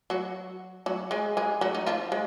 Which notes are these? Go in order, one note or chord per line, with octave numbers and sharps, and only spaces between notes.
F#3 F#4
F#3 F#4
G#3 G#4
G#3 G#4
F#3 F#4
D#4
F3 F4
G#3